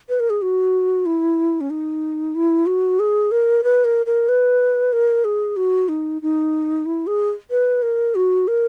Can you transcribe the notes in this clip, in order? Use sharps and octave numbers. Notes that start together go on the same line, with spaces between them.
B4
A#4
G#4
F#4
E4
C#4
D#4
E4
F#4
G#4
A#4
B4
A#4
A#4
B4
A#4
G#4
F#4
D#4
D#4
E4
G#4
B4
A#4
F#4
A#4